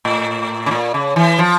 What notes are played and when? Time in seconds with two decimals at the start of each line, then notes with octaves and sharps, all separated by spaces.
0.05 A2
0.66 C#3
0.71 A#2
0.94 C#3
1.16 E3
1.38 F3